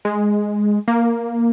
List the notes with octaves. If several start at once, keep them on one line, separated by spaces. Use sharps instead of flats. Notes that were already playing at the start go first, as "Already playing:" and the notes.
G#3
A#3